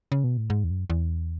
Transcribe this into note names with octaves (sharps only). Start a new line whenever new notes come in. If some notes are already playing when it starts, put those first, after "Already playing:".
C#3
B2
A2
G#2
E2
F#2
E2